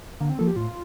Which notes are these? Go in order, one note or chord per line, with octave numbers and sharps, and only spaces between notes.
D3 A#3
C4
F3 A#3 A4
G4
A2 F4